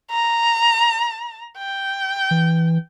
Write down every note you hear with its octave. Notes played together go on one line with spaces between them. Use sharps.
A#5
G5
E3